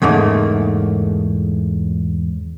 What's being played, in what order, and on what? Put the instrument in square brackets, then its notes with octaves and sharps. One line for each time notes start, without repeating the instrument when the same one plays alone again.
[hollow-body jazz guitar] E2 G#2 C#3 A3 A#3